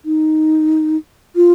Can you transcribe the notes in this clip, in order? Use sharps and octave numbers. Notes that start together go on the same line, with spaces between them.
D#4
F4